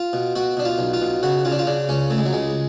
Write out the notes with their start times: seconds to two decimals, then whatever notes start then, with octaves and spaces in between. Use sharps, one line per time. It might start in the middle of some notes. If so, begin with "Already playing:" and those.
Already playing: F4
0.13 B2
0.36 B2 F#4
0.57 B2 D4
0.65 F4
0.79 B1
0.94 F4
1.02 B2
1.23 C#3 F#4
1.45 C#3 F4
1.52 D4
1.59 F4
1.67 C#3 D4
1.89 C#2 C#4
2.10 C#3 A3
2.18 G#3
2.26 F#3
2.33 C#2 G#3